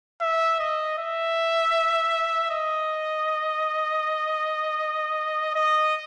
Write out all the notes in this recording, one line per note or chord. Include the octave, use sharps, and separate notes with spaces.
E5
D#5
E5
D#5
D#5